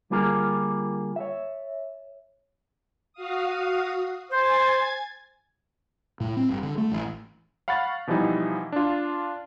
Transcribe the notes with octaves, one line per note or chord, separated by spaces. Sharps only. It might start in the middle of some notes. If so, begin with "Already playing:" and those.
D3 G3 A#3 F4 G#4 A#4
C#5 E5
F#4 F5 D#6
C5 G#5 G#6 A6
A2
C4
G1
D3
A3
A1
F5 F#5 B5 C#6 A6
B2 E3 F3 G3 D#4 E4
D4 F4